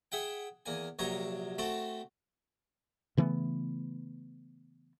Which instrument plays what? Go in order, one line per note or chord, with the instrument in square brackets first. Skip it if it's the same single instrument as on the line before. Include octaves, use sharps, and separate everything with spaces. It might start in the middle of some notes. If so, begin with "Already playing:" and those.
[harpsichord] G#4 E5 F#5 G5
E2 A#3 G#5
A#1 C3 F#3 C#5 A#5
A3 C4 F#4 A4
[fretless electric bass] C#3 E3 A3 B3